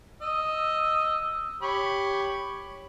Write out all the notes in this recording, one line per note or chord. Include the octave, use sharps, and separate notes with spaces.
D#5 E6
G4 C#5 B5